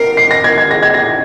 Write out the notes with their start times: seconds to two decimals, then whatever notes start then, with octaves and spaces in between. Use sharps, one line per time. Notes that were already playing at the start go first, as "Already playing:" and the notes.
Already playing: A#4 A#6 C7 D7
0.17 C7
0.31 A#6
0.44 G#6
0.58 G#6
0.71 G#4 A#6
0.83 G#6
0.94 A#6